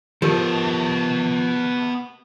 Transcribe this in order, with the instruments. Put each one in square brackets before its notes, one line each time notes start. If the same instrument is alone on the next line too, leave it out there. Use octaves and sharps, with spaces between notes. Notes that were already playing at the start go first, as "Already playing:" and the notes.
[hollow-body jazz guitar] F3 [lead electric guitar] B3 A5 [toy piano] G4 A#4